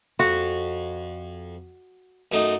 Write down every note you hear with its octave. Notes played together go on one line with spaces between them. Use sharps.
F2 F#4
F#2 A3 D#4